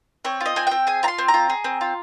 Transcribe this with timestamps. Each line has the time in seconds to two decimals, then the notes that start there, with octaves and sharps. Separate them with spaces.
0.25 C4 C#5
0.40 F4
0.46 D#5
0.56 C4 G#5
0.67 C4 G5
0.87 G#4 G#5
1.03 F4 A#5
1.08 C6
1.18 C4
1.28 A#5
1.34 F4
1.50 G#4
1.64 C4
1.81 F4